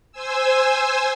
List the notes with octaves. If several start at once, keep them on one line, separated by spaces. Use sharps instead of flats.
C5 G#5 E6